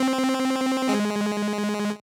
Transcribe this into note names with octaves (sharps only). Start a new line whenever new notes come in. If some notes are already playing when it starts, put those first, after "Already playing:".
Already playing: C4
G#3